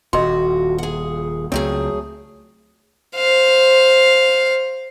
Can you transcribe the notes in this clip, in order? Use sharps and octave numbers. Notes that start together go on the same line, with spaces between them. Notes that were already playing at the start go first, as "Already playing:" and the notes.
D#1 F#4 D#5 C6
G#4 F#5
C#2 F#3 A3 C4 G#4
C5 F5